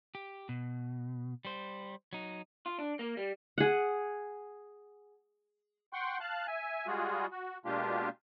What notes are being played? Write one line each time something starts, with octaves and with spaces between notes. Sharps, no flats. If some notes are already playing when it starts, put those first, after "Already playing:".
G4
B2
G3 C5
F#3 D#4
F4
D4
A#3
G3
G#4 F#5
F#5 G5 C6 C#6
F5 A5 F#6
E5 G#5
G3 G#3 F4 F#4 G#4
F#4
B2 G#3 A#3 D4 F4 G4